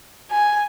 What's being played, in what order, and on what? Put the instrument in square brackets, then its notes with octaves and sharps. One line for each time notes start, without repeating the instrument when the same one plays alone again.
[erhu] G#5